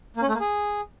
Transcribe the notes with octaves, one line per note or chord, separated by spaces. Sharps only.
A#3
C#4
A3
A#3
G#4